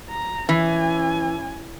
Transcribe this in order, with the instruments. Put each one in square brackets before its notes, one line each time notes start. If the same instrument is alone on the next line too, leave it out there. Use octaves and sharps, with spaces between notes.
[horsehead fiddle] A#5
[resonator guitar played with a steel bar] E3 [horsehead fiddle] C#4 G#5